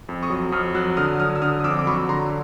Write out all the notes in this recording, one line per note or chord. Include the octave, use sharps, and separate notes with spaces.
F2
C#6 D#6
F#3
F2 D#6 F6
F#3 E6 F#6
D3 D#6 F6
F#3 D#6 F6
E6
D3 D#6 F6
D#6
F2 D6 E6
D6
F#3 B5 C#6
D3 A#5 C6